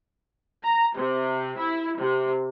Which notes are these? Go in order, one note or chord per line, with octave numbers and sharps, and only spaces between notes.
A#5
C3
E4
C3